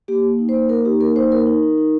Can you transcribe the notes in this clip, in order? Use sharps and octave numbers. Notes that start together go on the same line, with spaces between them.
A#3 G4
A#3
D#4
C5
A#3
A#3 A#4
D#4 G4
A#3 A#4
D#4 C5
A#3 A#4
D#4
D#4
D#4